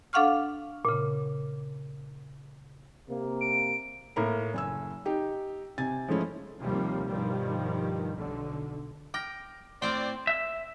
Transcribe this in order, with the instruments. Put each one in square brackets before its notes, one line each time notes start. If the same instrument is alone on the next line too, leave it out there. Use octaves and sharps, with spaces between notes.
[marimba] D4 A4 F5 F#5 C#6 F6
A#2 C#3
[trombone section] C3 A#3
[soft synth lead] D7
[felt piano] A2 A#3 A#4 B5
F#1 G#5 E6
D#4 G4
C3 G#5 A6
F3 G#3 A3 C#4 E4
[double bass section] D#2 C3 F3 G3 A#3
G2 B2 D#3 F3 G3
B1 D3
[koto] G5 [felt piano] D6 F6 A#6
[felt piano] A2 F6 [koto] C4 G5 [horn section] C5 D5
[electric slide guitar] E5